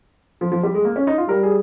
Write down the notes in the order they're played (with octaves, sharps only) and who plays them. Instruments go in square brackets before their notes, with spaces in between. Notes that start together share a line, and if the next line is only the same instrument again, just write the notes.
[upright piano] F3
F3
G3
G#3
A#3
C#4
D#4
F4
[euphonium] G3 [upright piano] A#4
[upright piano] G#4